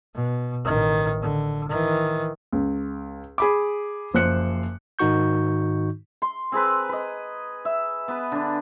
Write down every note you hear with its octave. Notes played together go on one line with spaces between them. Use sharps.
B2
A1 D#3
D3
D#3 E3
C#2
G#4 B5 D6
F#1 F3 C5 F#6 C#7
G#2 D#3 D#4 F#4 C#6 G6
C6
C4 G#4 A#4 B4
B4 D#5
E5
B3 B4
D3 D4